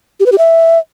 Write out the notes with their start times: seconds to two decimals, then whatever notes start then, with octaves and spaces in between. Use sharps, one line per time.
0.20 G4
0.26 B4
0.32 G4
0.38 E5